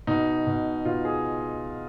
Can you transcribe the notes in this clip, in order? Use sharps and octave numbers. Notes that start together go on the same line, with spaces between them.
B2 D#4
B2
B2 F4
G#4